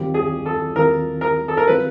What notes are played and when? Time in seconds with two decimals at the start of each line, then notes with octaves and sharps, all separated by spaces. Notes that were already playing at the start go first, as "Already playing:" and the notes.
Already playing: D#2 D#3 G3 C4 F4 G4
0.14 G#4
0.46 A4
0.76 D#2 D#3 G3 C4 F4 A#4
1.21 A#4
1.48 A4
1.57 A#4
1.68 D#3 G3 C4 F4 B4